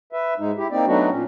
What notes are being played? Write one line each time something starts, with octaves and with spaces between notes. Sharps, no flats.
B4 E5
G#2 G#3 D#4
E4 G4
A#3 C4 D#4 D5
F#3 A3 B3 D4 D#4 F#4
A#2 C#4